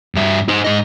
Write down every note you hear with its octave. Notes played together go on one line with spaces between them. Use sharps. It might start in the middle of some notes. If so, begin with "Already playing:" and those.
G2 E5
D#4 C5
G#2 D#5